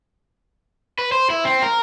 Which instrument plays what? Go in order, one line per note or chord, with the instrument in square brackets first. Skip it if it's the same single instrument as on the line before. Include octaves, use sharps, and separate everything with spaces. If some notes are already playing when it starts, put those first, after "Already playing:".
[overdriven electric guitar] B4
C5
E4
C4
A#4